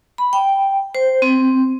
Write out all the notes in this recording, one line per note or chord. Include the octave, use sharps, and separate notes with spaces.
B5
G5
C5
C4